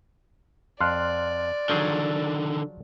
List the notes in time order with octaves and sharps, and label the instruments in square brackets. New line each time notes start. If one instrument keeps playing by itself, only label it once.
[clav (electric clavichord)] F2 [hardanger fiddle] D5 [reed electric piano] C6 F6 F#6
[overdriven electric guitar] D3 D#3 [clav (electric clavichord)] F3 F#3 G#4